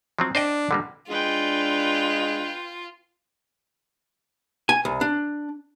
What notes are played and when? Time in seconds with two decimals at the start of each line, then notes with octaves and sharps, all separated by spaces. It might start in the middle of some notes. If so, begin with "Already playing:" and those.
0.19 F3 F#3 C4
0.35 D4 C5 D#5 G5
0.71 D3 G3 A#3
1.10 G#3 D4 F4 B4 G5
4.69 G#5
4.85 C2
5.01 D4